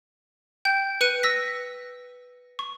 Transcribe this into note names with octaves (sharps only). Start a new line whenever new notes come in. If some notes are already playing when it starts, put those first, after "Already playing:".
G5 G6
B4 F#6 C#7 D#7
E6 A#6 B6
C#6